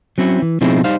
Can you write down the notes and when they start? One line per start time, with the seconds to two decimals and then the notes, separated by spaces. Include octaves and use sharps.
0.18 F#3 C4 C#4 E4
0.42 E3
0.61 B2 F3 C4 D#4 E4 G#4
0.84 G3 D#4 C5 F5